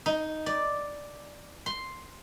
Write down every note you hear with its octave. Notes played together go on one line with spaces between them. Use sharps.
D#4
D5
C6